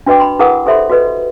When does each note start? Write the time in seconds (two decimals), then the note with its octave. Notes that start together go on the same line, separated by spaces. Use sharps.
0.06 D4 F#4 B4 D#5 G5 D6
0.20 B5 C6
0.39 E4 G#4 A#4 B4 F#5 D#6
0.66 G4 A4 C5 E5 B5 C6
0.90 F#4 A4 B4 D#5